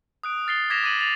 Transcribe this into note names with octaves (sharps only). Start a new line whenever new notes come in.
D#6 F#6 D7
F6 A6 C7 G7
D6 G#6 A#6 B6 E7 F7
D6 A6 D#7 E7 F#7
A6 F7